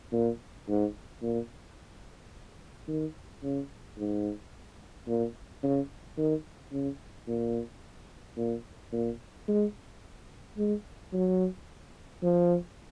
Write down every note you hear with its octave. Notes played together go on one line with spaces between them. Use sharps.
A#2
G#2
A#2
D#3
C#3
G#2
A#2
C#3
D#3
C#3
A#2
A#2
A#2
G#3
G#3
F#3
F3